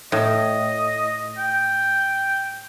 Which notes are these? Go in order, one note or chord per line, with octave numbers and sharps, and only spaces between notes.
A2 D#5
G5